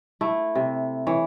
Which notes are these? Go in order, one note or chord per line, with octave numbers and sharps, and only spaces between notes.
A3 E4
C3
E3 C#5